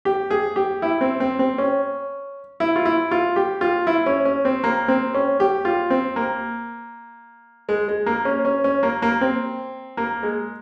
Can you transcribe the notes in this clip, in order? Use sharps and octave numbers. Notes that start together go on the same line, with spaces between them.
G4
G#4
G4
E4
C4
C4
C4
C#4
E4
F4
E4
F4
G4
F4
E4
C#4
C#4
C4
A#3
C4
C#4
G4
F4
C4
A#3
G#3
G#3
A#3
C#4
C#4
C#4
A#3
A#3
C4
A#3
G#3